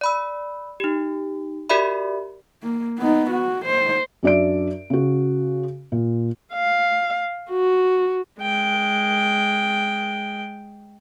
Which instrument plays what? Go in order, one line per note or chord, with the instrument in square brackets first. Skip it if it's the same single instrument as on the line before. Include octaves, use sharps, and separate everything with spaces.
[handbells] D5 B5 E6
D#4 G4
F#4 G4 A#4 D5 E5 B5
[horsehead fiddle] A#3
B3 D#4
F#4
C5
[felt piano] F#2 D4 D5 E5 D7
C#3 F#4
A#2
[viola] F5
F#4
[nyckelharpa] G#3 G5